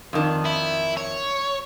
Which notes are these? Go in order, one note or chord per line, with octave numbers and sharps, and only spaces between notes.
F2 D#3 D4
E4
C#5